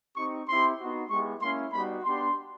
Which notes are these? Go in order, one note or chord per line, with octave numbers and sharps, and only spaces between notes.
C4 D#4 G4 C#6
C4 E4 G4 C6
B3 D#4 F#4
G#3 B3 E4 G4 C#6
A#3 C#4 E4 C6
G3 B3 D#4 F#4 B5
B3 D4 G4 C6